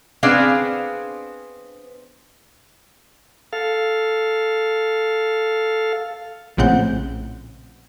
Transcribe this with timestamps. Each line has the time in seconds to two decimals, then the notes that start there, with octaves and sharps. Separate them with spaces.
0.23 B3 C4 D4 G#4 F5
3.53 A4 F5
6.57 A#1 A2 C#3 C4 F#5 G6